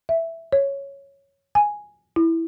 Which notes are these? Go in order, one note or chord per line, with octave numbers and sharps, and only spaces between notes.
E5
C#5
G#5
E4